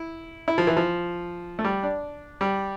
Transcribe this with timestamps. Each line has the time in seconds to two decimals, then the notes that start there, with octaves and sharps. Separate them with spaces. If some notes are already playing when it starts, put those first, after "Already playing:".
Already playing: E4
0.48 E4
0.58 F3
0.67 E3
0.77 F3
1.59 A3
1.64 G3
1.83 D4
2.41 G3